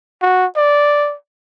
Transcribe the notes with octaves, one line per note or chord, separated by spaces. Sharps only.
F#4
D5